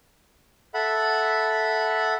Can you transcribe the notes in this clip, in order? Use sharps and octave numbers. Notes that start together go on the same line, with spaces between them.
A4 E5 F#5 B5